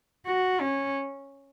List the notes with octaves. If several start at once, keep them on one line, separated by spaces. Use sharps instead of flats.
F#4
C#4